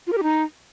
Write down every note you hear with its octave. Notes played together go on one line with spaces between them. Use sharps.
F4
A#4
G4
D#4